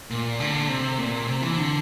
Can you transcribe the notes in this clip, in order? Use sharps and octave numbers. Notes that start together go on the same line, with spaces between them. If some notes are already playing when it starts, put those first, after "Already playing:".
A#2
D3
C3
A#2
C3
E3
D3